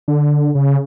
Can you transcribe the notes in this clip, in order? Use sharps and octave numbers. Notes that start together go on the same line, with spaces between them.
D3
C#3